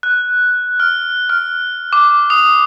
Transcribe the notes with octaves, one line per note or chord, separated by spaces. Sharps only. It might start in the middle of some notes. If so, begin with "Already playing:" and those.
F#6
F6
F6
D6
D#6